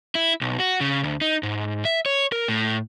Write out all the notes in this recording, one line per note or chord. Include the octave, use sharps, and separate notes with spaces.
E4
B1
F#4
C#3
D2
D#4
G#2
E5
C#5
A#4
A2